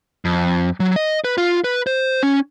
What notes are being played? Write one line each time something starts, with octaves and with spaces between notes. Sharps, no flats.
F2
F#3
D#5
B4
F4
B4
C5
C#4